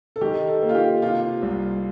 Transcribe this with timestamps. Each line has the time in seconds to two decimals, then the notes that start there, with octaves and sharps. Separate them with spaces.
0.16 A4
0.21 D#3 G4
0.48 A4
0.62 A#3
0.69 F4
0.75 G4
1.02 C3 F4
1.43 C2